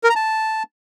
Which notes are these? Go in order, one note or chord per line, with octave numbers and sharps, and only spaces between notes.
A#4
A#5
A5